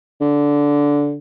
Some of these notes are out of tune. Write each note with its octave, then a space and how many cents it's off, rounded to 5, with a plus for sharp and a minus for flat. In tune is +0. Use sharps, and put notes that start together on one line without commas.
D3 -15